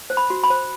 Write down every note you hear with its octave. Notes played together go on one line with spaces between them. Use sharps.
C5
B5
F#4
B5
C5